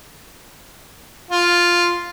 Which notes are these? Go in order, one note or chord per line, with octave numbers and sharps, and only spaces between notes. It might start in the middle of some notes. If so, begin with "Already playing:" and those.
F4